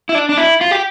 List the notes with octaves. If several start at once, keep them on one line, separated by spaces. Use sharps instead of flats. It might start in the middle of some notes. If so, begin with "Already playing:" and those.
E4
D4
D4
E4
F4
G4